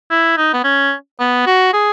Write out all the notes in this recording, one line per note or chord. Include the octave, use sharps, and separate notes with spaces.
E4
D#4
B3
C#4
B3
F#4
G#4